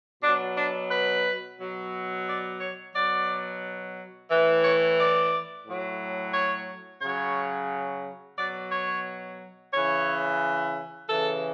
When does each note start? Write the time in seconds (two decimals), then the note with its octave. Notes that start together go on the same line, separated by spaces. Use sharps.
0.23 B2 F#3 D4
0.57 D4
0.91 B4
1.59 B2 F#3
2.27 D5
2.61 C#5
2.95 B2 F#3 D5
4.30 A2 E3
4.64 C#5
4.99 D5
5.66 A2 F#3
6.34 C#5
7.01 C#3 F#3 C#5
8.37 B2 F#3 D5
8.72 C#5
9.73 C#3 E3 C#5
11.09 C#3 E3 A4